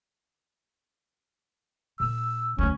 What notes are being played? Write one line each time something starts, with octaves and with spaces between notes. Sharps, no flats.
A#2 E6
D2 D3 C#4